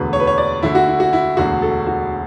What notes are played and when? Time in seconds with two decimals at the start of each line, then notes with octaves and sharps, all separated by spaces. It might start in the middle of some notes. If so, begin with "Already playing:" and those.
Already playing: E1 D2 D3 B4
0.13 C#5
0.20 B4
0.27 C#5
0.38 D5
0.63 D2 D3 E4
0.75 F#4
0.88 E4
1.00 F#4
1.13 E4
1.37 E1 D2 D3 F#4
1.62 A4
1.87 F#4